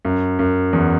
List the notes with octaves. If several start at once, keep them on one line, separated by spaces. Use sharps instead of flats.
F#2
F#2
E2